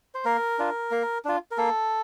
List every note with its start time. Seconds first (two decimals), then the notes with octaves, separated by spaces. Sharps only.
0.15 C5
0.25 A#3 A#4
0.59 D4 F4
0.91 A#3
1.25 D4 F4
1.51 A#4
1.58 A#3 A4